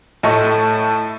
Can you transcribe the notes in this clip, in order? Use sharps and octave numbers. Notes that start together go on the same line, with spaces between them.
A2 A3 D#5 E5 A5 C#6